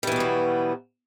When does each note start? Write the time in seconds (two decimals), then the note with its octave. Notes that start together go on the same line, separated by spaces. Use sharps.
0.03 G3
0.07 E3
0.12 B2
0.16 B3
0.20 F#3